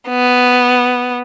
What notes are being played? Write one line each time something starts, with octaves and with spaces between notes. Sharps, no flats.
B3